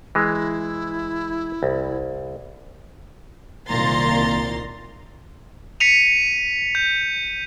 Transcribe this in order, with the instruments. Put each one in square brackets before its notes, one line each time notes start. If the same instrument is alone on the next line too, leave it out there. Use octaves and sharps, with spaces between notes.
[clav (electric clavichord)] E3 G#3 [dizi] E4
[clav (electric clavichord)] C2
[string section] C2 A#2 D#3 A#5 C6 A6
[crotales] B6 C#7 D#7 F7
G6